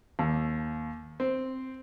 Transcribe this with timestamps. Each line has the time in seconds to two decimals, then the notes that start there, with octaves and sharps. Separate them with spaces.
0.19 D#2
1.20 C4